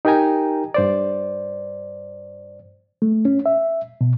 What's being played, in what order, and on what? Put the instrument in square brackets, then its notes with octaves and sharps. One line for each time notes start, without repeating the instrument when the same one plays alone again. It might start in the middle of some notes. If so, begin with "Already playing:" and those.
[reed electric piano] D#4 G4 A#4 G5 G#5 A#5
G2 C5 D5
A3
C#4
E5
B2